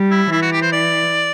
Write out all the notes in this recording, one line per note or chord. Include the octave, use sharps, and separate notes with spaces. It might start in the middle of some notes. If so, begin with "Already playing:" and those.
Already playing: G3
E4
E3 E4
F#4
G4
C5
D5